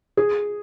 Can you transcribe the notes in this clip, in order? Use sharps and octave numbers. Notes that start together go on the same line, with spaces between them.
G#4